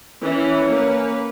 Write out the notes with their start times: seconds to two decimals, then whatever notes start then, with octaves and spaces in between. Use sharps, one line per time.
0.23 E3 C#4
0.68 A#3 B4